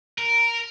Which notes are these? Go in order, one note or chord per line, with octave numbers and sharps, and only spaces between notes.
A#4